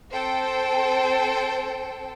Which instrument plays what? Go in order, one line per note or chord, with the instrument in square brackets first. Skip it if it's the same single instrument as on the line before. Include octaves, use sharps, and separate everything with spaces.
[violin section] C4 A4 C5 G5